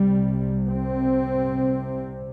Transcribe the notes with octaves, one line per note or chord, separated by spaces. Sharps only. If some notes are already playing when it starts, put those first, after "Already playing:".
Already playing: C2 C3 G3
C4